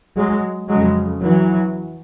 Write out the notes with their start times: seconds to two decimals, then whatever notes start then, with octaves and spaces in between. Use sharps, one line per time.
0.16 F#3 G#3
0.68 F2 C#3 F#3 G#3
1.22 E3 F#3